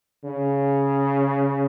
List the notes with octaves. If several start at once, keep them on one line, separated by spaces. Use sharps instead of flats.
C#3